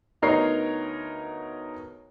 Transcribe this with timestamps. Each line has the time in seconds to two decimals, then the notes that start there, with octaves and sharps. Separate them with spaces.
0.22 D2 B3 D#4 A#4 C#5 C7